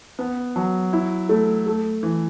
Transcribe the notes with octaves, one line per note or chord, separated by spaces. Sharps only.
B3
F#3
E4
A3
A3
E3